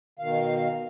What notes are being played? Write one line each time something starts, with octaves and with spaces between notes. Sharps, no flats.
B2 D#3 F5